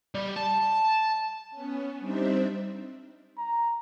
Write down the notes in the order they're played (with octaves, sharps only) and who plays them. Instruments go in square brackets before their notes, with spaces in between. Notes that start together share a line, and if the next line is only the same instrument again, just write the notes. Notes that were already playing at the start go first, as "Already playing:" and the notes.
[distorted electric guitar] G3
A5
[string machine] B3 C#4
G3 C4 D4 D#4 C5 E5
[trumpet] A#5